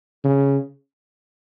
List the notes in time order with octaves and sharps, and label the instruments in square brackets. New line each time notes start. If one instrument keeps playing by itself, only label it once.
[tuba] C#3